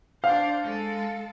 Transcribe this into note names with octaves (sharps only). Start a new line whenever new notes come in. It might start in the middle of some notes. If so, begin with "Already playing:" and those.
D4 C5 F5
G#3 A4